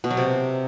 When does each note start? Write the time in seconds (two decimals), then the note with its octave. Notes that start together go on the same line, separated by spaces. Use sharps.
0.04 B2
0.11 F#3
0.17 C3